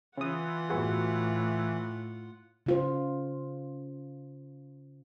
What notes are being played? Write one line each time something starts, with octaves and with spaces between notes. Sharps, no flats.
C#3 E3 F4 F#5 D#6
A2 B3 F#4 G#4
C#3 F4 C5